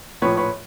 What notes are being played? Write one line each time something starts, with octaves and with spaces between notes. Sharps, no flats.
A#1 A2 F3 B4 C#5
B4 C#5